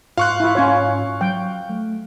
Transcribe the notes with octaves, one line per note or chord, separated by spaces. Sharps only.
G#2 F4 F5 C#6 F#6
E4 F4
C#4 F4 C#5
F#3 G5
A3